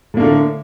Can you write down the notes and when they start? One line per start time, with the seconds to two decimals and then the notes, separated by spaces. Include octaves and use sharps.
0.14 A2
0.17 A#3
0.20 D3